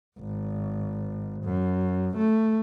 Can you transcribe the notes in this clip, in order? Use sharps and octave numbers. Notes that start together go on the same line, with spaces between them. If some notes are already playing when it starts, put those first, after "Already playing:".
G#1
F#2
A3